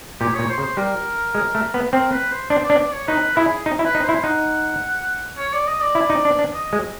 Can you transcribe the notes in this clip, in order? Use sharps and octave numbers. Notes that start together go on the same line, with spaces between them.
A#2 G4
A#2 C#5
C5
C#3
C5
G3 A#4
G#3
A3
B3
C4 A#4
B4
C5
D4 C5
D4 D5
D5
C#5
D#4 B4
E4 G#4
D#4
E4
B4
D#4
C5
E4
D#4 F#5
C#5
D5
D#5
D5
E4
D#4
D4
D4
D#5
G#3